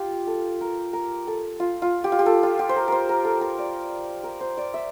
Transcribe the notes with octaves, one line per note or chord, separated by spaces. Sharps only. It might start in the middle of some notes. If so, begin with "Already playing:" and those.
Already playing: F4 G4
A4
A#4
A#4
A4
F4
F4
G4
F4
G4
A4
F4
G4
C5
A#4
A#4 C5
A#4
A4
A#4
D5
A#4
C5
D5
E5